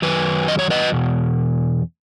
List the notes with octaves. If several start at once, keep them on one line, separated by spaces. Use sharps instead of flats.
F#2 D#3 F#3 B4
D#5
C#5
B4 D#5
E2 B2